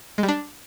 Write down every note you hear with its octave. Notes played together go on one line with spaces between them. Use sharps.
G#3
G3
D4